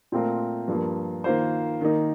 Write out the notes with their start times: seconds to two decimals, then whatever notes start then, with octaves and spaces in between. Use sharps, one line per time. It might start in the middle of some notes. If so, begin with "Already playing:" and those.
0.12 A#2 A3 C4 F4 A#4
0.68 G2 F3 A#3
1.24 D#3 A#3 F4 C5
1.81 D#3 A#3 D#4